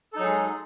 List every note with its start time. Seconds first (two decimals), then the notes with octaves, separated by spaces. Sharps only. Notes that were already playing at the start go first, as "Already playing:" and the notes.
0.13 A4
0.16 D#4
0.19 F#3
0.22 G#4
0.25 G#3